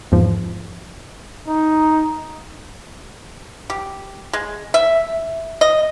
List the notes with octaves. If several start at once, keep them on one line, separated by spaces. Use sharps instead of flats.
E2 G#2 F3
D#4
G4
G#3
E5
D#5